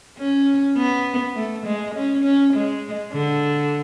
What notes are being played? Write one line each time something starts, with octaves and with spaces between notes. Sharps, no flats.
C#4
B3
A3
G#3
C#4
C#4
G#3
D3